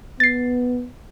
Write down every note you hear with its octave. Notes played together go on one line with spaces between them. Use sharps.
B3 A6 C7